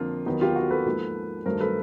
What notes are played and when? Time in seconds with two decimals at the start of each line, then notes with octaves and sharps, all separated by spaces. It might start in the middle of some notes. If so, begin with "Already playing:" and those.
Already playing: F2 D3 F3 A#3 F4
0.26 D#2 D#3 F#3 B3
0.41 F4 G4
0.56 F#4
0.71 A4 B4
0.85 G#2 F3 A#3
1.46 G2 D#3 F#3 A3 A#4 C5
1.60 A4 B4